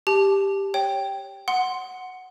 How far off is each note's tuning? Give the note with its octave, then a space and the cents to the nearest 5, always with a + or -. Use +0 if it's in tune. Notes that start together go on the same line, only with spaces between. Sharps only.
G4 +5 A5 -20
C#5 +0 G5 +0
F#5 +0 C6 +0